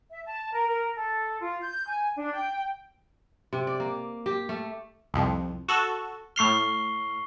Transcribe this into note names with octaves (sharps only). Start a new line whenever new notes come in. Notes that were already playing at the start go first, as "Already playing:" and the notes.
E5
A5
A#4
A#4
A4
F4
G6
G#5
D4
G5
C3
D5
A#3
G4
A3
C2 F2
F#4 A4
A2 C#6 F6 C7 G7